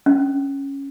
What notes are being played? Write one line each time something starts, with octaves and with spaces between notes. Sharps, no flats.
C#4